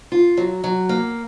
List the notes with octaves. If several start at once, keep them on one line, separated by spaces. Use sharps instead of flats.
F4
F#3
F#3
A#3